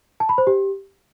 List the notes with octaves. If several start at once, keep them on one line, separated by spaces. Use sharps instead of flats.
A5
B5
C5
G4